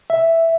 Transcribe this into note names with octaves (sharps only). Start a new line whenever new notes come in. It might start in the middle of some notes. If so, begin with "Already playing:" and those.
E5